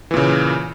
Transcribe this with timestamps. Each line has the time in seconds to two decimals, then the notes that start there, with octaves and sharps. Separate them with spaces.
0.11 E3
0.14 A#2
0.17 C#3